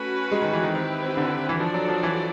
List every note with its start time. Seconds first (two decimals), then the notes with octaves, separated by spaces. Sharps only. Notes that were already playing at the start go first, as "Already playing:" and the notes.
Already playing: A3 C#4 F#4 B4
0.31 G#3
0.42 D#3
0.53 E3
0.63 D#3
0.75 D#3 C4 E4 G4 B4
1.17 D3
1.49 E3
1.60 F3 D4 F#4 A4 D5
1.74 F#3
1.88 F3
2.03 E3